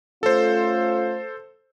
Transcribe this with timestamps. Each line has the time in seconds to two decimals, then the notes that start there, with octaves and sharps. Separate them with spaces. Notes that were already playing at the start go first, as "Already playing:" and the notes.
0.23 A3 C#4 F4 A4 C5